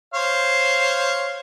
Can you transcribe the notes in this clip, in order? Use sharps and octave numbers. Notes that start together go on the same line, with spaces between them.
C5 C#5 F5